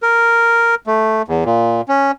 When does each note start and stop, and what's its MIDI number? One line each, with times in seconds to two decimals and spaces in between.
0.03 0.75 70
0.87 1.22 57
1.28 1.44 40
1.45 1.81 46
1.88 2.11 61